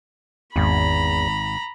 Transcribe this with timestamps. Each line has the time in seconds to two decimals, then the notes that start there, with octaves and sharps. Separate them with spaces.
0.56 G#1 E2 A#5 B5